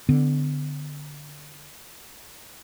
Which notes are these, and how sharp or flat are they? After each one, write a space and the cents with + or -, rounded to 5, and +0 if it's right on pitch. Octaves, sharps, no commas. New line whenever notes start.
D3 +0 B3 +35